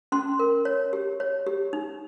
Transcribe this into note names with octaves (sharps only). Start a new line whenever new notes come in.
C#4 C6
A#4
C#5
G4
C#5
G4
D#4